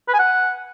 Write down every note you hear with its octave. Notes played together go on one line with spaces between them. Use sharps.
B4
G#5
F#5